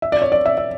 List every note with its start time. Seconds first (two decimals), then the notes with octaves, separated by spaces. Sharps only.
0.02 E5
0.12 D5
0.22 C#5
0.32 D5
0.46 E5
0.58 E5